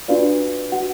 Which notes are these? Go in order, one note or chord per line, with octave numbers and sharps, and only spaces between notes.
D4 F4 F#4 B4 D5 F5
F#4 F#5